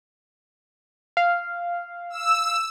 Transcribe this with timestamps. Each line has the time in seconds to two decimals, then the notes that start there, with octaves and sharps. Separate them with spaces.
1.17 F5
2.10 E6